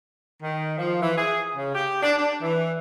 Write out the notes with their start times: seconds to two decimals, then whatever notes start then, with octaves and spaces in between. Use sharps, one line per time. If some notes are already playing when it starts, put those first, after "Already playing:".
0.42 D#3
0.78 F3
1.02 E3
1.17 G#4
1.55 C#3
1.74 G4
2.03 D4
2.18 D4
2.41 E3